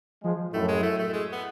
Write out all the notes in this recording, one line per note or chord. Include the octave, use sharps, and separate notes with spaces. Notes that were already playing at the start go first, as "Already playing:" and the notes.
F3 G#3
F#2 A2 A3
G#3
A3
A3
G#3
B3